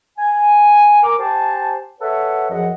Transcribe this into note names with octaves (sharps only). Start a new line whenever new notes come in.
G#5
A#4 D6
G4 C5 G#5 A5
A4 B4 C#5 E5 F#5
F#2 F3 G#4 D#5 F#5